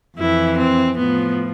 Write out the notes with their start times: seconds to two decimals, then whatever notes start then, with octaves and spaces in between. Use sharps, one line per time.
0.18 F2 E3 E4
0.57 C4
0.97 A2 F3 B3